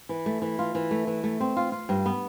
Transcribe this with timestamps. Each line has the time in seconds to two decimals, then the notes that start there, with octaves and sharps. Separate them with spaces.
0.09 E3
0.26 A3
0.42 E3
0.59 F4
0.75 E3
0.91 A3
1.07 E3
1.24 A3
1.40 C4
1.57 F4
1.72 F4
1.89 G2
2.06 B3